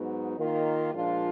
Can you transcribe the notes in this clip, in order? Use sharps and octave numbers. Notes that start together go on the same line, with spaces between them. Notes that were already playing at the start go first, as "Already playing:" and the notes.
Already playing: G#2 F#3 B3 D#4
D#3 A#3 F4
A#2 F3 G#3 D4 F4